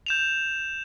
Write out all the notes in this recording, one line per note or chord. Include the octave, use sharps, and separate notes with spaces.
G6 E7 F7